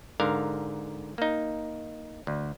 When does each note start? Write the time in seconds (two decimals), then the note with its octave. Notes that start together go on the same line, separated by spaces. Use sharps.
0.20 G#2 D3 A#4 F5
1.18 A#3 D#4
2.27 D2